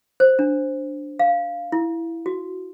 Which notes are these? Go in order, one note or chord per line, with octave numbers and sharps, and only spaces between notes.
C5
D4
F5
E4
F#4